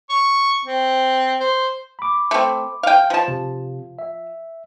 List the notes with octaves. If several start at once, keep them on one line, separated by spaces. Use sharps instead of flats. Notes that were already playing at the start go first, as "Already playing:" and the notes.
C#6
C4
C5
B5 D6
A3 C4
F5 G5
F3 A5
C3
E5